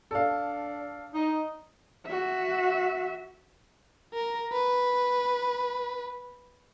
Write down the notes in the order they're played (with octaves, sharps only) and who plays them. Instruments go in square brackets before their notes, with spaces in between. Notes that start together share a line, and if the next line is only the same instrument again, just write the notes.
[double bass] D4 [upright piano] A4 F5
[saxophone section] D#4
[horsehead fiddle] F#4 E5
[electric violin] A#4
B4